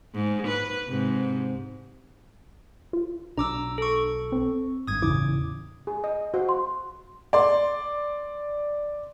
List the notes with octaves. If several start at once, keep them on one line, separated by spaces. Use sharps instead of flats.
G#2
B4
G#2 C3
F4
B1 D4 A#5 D6 E6
A4 C#6
C4
G#1 G2 D#6 G#6
A1 E2 C#3 E4 D6
G#4
D#5
F#4 C5 F5
C6
D5 C6